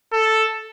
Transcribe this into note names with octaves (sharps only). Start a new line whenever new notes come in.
A4